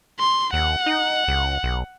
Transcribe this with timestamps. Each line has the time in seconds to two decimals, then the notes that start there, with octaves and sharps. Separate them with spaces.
0.19 C6
0.53 D#2 F#5
0.86 D#4
1.28 C#2
1.63 B1